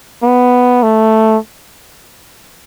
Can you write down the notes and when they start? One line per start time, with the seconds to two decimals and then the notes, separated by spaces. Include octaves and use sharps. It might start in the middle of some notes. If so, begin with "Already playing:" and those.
0.23 B3
0.83 A3